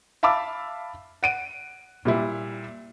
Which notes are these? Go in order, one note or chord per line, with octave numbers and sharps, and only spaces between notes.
E5 F5 A5 B5 D6 E6
F#5 D7 D#7
A#2 G3 E4